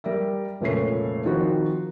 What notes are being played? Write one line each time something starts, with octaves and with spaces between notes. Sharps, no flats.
G3 A#4 D5 E5
F1 C#2 A#2 A3 C#5 C7
D#3 F3 C4 D#4 F#4